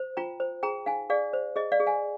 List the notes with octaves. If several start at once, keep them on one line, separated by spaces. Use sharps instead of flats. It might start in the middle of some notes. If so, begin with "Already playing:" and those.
Already playing: C5
F4 G5 A#5
C5
G#4 G5 A#5
D#4 F5 G#5
G#4 D5 F5
C5
G#4 D#5
D5 F5
G#4
F5 G#5